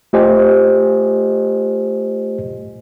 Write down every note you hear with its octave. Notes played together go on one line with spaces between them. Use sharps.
A3 F4 G4 C5 D#5 G#5